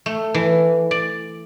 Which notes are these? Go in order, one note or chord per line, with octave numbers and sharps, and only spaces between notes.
A3
E3
D5